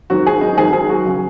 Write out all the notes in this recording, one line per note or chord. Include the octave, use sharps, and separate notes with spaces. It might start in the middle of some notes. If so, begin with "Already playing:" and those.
G#2 D#3 F#3 F#4
G#4
D#4
G#2 D#3 F#3 G#4
G#4
F#4
C#3 F#3